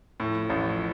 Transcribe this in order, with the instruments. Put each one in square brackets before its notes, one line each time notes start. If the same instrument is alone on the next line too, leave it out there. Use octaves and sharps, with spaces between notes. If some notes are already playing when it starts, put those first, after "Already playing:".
[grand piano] A2 [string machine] F3
[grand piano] A1 [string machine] F3